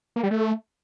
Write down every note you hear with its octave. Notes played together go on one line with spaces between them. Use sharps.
A#3
G3
A3